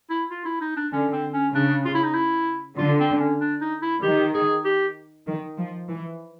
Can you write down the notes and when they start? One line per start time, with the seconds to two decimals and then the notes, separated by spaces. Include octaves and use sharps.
0.10 E4
0.30 F4
0.45 E4
0.61 D#4
0.77 D4
0.92 D3 C#4
1.13 C4
1.33 C#4
1.54 C#3 D4
1.85 F4
1.95 E4
2.04 D#4
2.14 E4
2.78 D3 F4
3.00 C4
3.20 C#4
3.41 D4
3.61 D#4
3.82 E4
4.03 D#3 G4
4.34 G#4
4.65 G4
5.26 D#3
5.57 F3
5.89 E3